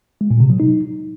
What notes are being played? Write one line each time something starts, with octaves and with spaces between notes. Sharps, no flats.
G#3
A#2
C3
F#3
D#4